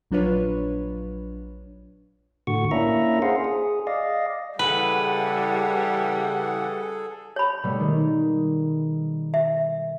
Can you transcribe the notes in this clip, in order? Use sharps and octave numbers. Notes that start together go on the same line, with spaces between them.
A#1 F#3 D4 F4 B4 C#5
A2 D3 F#4 C#6
A#3 C#4 D4 E4 E5 A#5
G#4 C5 F5 F#5
G#4
D5 D#5 F5
C#3 E3 G3 G#4 A4 B4 F#5
C#5 B5
B2 G3 A3
D#3 G#3
E5